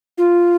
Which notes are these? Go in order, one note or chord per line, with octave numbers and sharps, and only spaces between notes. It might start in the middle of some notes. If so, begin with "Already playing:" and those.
F4